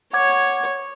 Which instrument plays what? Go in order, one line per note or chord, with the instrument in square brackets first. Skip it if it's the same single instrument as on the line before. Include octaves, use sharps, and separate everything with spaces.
[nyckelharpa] C#5 [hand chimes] F#5 D6 G#6